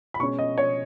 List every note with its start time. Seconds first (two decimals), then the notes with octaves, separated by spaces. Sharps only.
0.14 B5
0.20 B2 G#3 C#4 C#6
0.39 D#5
0.58 C#5